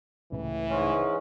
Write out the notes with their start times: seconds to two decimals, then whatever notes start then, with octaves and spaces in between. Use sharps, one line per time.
0.32 C#2 A2 C#3 E3
0.70 G#2 G#3 C#4